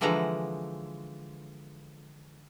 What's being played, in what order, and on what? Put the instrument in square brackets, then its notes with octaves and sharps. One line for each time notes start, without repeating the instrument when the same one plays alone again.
[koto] D3 E3 F3 G#3 F#5 A#5